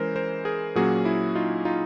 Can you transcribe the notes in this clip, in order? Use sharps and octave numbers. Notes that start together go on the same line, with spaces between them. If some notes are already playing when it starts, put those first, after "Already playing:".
Already playing: E3 G#3 C#4 A#4 C5
A#4 C5
G#4 A#4
A#2 F#3 A#3 C#4 F#4 G#4
E4
D#4 F4
D#4 F4